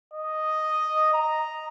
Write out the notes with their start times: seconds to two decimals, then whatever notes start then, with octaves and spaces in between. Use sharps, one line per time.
0.14 D#5
1.14 A#5